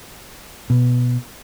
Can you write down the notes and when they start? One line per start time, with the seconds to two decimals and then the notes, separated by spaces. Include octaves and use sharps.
0.70 B2